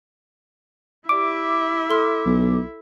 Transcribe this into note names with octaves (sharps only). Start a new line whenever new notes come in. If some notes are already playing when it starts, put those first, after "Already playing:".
E4 G4 D5 E5 D6 D7
A4 C6 F6
B1